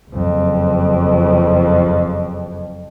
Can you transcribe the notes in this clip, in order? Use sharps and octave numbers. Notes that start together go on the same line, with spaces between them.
F#1 F2